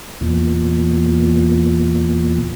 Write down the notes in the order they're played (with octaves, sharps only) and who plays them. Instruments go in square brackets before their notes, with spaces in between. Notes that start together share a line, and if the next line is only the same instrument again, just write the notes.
[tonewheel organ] E2 A#2